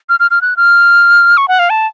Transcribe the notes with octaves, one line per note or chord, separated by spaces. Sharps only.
F6
F6
F6
F#6
F6
C#6
F#5
F5
A5